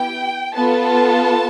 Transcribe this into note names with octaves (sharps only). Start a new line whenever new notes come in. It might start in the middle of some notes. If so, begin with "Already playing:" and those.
Already playing: B3 E4 G4 G5
B3 F4 A4 A5